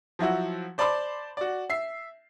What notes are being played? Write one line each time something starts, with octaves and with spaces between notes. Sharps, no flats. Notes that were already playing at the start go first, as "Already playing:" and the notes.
F3 F#3 E4 F#4
C5 D5 A5 B5 C6 D6
F#4 D5
E5 C7